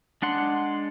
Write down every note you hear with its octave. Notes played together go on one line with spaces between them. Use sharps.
G#3 D4 F#5 C6